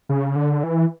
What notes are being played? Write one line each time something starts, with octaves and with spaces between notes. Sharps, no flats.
C#3
D3
E3